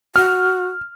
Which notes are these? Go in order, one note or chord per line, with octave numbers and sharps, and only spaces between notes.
F#4 F6